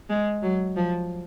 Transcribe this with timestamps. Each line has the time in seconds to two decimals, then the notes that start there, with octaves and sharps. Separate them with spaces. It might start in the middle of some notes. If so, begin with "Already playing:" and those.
0.09 G#3
0.42 F#3
0.76 F3